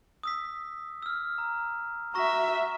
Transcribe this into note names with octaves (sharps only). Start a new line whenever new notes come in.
D#6 E6 B6
E6 F6
A#5
F#4 E5 A#5 C#6 A#6